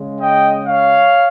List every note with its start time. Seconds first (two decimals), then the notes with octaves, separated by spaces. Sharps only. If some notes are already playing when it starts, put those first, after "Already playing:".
Already playing: C#3 G#3
0.19 D#5 G5
0.66 C#5 F5